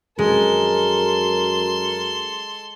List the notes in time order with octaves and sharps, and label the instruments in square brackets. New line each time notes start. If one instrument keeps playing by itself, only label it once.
[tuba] F#2 [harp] G#3 [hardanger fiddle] A4 C6 [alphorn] A#4